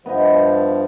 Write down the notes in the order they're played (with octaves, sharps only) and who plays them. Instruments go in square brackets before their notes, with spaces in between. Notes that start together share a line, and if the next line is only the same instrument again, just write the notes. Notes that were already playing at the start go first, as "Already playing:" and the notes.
[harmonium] G2 F3 [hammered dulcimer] B3 E4 D#5